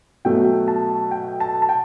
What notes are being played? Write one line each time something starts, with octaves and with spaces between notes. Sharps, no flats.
B2 F#3 A3 G5
A5
G5
A5
A5
G5